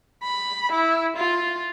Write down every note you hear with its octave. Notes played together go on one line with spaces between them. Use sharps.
B5
E4
F4